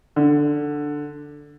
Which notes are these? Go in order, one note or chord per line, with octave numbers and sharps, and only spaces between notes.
D3